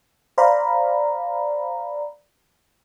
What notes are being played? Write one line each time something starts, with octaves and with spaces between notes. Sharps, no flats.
C5 D5 F5 A#5 B5